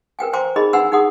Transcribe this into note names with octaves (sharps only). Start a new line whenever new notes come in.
A#4 B4 G5 G#5
C5 G5 G#5 A#5 C6 D6
D#4 G#4 A#4 D#5 B5 C6
D4 B4 F#5 G#5 C6 E6
D#4 G#4 F#5 C6 D#6